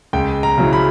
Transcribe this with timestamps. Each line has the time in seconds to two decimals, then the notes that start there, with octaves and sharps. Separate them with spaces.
0.13 C#2 G5
0.43 A#5
0.58 C#3 F#3 C#4 E4
0.73 B5